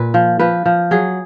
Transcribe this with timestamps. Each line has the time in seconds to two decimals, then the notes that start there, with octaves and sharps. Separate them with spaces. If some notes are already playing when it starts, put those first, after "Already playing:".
Already playing: A#2 B4
0.14 F3
0.39 F3 B4
0.65 F3
0.91 F#3 G#4